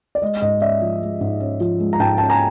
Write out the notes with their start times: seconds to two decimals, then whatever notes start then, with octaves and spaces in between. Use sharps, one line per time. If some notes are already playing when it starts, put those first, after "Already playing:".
0.15 D5
0.22 G#3 D#5
0.42 G#2 D#5
0.62 C#4 D5 E5
0.81 F3
1.02 G#3
1.21 G#2
1.40 C#4
1.60 F3
1.80 G#3
1.93 A#5
2.00 G#2 G5 A5
2.18 C#4 A5
2.30 G#5 A#5